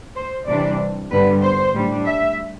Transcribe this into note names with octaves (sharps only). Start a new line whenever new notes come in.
C5
C3 E3 G3 D4 D5
G2 D3 G3 B3 B4
C5
A2 G3 D4
E5